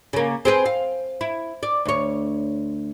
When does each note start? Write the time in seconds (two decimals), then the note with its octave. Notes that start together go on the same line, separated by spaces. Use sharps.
0.13 C#3 A#3
0.45 C4 G#4 B4
0.66 F5
1.21 E4
1.63 D5
1.85 D2 C#5